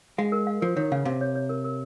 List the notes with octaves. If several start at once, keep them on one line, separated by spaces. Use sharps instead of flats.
G#3 F5
A#4
F5
F3 A#4
D#3 C#5
C#3 F5
C3 F5
C#5
C#5
A#4
A#4